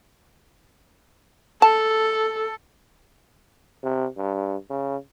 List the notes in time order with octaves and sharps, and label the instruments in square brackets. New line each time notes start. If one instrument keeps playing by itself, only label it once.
[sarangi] A4 [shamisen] A5
[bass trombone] C3
G2
C#3